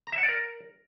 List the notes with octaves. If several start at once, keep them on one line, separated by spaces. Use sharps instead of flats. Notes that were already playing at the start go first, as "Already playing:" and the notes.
A#5
E5
F#5
D5
A#4